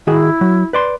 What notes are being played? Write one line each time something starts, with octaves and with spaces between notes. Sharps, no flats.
D#3 E4 F#4 G#4
F#3
B4 D5 C6